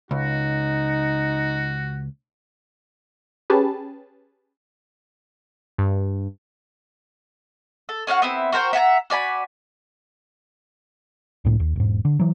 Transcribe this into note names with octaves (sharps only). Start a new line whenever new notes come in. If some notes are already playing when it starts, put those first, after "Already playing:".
C#2 D#4 F#4
C#4 G4 G#4 B4 A5
G2
A4
C#4 F#4 F5 F#5
B3 C4 E4
F#4 A#4 C5 G5
E5 F#5 G#5 A#5
F#4 D5 G#5 B5
C#2 A2
D#2
E1 G#2
D3
E3 F#3